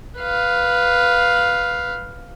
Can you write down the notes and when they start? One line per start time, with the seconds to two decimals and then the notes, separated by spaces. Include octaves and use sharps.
0.18 B4 F5